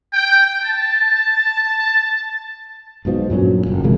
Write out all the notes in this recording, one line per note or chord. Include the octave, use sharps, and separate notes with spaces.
G5
A5
B1 G#2 B2 F3
G2 A#2 F#3 C#4
F#1 F#2
C3 E3 G#3 A#3